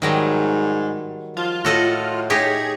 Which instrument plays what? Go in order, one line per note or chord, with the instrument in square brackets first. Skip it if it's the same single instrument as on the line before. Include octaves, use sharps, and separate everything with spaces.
[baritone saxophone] G#2 [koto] D#3 F#3 G3
[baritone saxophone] F3 [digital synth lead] F4
[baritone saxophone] A2 [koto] F#4 A4 D#5
[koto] D#4 G4 C#5 [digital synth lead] G#4